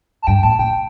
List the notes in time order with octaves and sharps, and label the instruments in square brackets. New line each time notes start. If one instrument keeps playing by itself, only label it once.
[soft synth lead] A5
[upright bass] G2 [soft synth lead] G5
[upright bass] A2 [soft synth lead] A5
[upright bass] A#2 [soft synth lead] G5